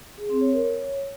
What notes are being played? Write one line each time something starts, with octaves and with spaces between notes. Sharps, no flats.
G#4
C4
C#5
A#4
C#5